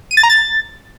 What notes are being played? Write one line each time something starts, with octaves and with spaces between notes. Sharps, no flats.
D#7
A6
A#5
A6